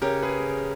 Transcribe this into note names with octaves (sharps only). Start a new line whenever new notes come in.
C#3 G4 A#4
G#4 B4